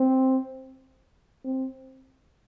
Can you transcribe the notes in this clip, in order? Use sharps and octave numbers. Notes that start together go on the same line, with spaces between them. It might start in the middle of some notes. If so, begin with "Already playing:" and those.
Already playing: C4
C4